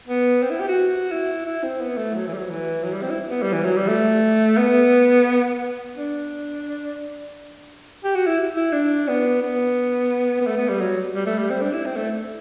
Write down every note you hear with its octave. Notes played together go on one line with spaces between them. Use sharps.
B3
C4
E4
G4
F#4
E4
E4
C4
B3
A3
F#3
E3
G3
F#3
E3
F#3
G3
C4
E4
B3
G3
E3
F#3
G3
A3
B3
D4
G4
F#4
E4
E4
D4
B3
B3
B3
A3
B3
G3
F#3
G3
A3
G3
C4
D4
E4
C4
A3